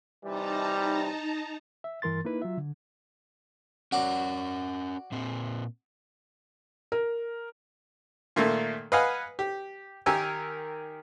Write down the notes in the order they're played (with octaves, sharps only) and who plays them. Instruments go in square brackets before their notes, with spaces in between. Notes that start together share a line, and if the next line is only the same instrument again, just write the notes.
[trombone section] C3 E3 G3 [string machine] D#4 A5 A#5
[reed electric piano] E5
G2 E3 A#4 C6 A6
A#3 D#4 E4 B4
F#3 F4 E5
D3
[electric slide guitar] C#4 A#4 [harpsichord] F#4 D5 D6
[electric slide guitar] A#2 C4
[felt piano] A#4
[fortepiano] A#2 D#3 A3 A#3 A4
B4 D#5 F5 F#5 G#5 B5
G4
D#3 G4 A#4 G#5 E6